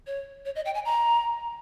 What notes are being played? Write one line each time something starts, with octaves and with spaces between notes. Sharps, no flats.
C#5
C#5
D#5
G5
G#5
A#5